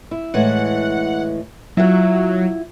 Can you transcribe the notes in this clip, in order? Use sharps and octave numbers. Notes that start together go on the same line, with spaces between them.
E4
A2 E3 G#3 F#5
F#3 E4 F4 F#5